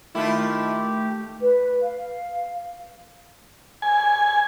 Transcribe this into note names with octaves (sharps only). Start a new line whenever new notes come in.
D#3 A3 E4 F4 G4
B4
F5
G#5